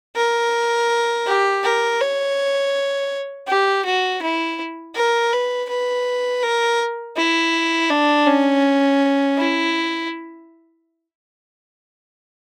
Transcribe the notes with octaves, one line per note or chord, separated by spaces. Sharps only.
A#4
G4
A#4
C#5
G4
F#4
E4
A#4
B4
B4
A#4
E4
D4
C#4
E4